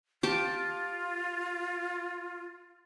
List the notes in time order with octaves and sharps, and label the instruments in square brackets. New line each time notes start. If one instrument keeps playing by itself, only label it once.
[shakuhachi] F4 [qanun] G4 A5 D6